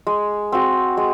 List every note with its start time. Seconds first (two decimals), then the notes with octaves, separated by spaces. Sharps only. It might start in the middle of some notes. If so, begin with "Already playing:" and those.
0.07 G#3
0.52 C4 F#4
0.97 G#3